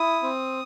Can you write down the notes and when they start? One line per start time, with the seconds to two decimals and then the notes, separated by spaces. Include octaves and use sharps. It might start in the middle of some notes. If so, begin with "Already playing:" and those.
Already playing: E4 D#6
0.23 C4